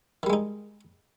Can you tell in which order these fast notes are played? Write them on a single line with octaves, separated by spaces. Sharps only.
D#3 G3 G#3 D#4